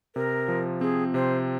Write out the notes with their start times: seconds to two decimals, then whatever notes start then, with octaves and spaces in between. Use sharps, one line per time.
0.15 C3 A#4
0.48 F3
0.81 C4 G#4
1.14 C3 C5